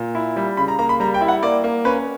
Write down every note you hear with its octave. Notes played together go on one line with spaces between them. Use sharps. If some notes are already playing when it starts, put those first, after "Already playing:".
Already playing: A#2
E4
G3
C#3 B5
A#5
A#3 A#5
B5
G3 A#5
G5
E4
F#5
A#3 D5
A#3
C#4 B4